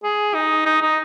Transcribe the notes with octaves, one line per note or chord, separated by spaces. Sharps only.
G#4
D#4
D#4
D#4